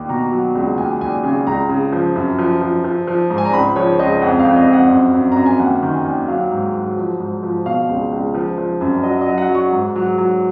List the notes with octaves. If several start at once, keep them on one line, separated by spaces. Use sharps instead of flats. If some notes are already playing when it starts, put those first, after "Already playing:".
Already playing: D#2
B2 A#5
F#3
C#2
D#2 G#5
D#2 G#5
C#3 G#5
C#2 A#5
C#3
F3
F#2
F3
F3
F3
F3
G#2
G#5
A#5
C#2 B5
F3 C#5
C#2 D#5
F2 F#5
F5
F2
D#5
F2
F#5
F#2
F#2
F#2 A#5
G#5
D#2 F#5
D#3
G#5
D#2
F#3 F5
G#2
F#3
F3
G#2
F3
B2 F5
C#2
C#2
F3
F3
F#2
F#3 D#5
D#5
F#3
F#5
F#3
C#6
G#2
F#3
F#3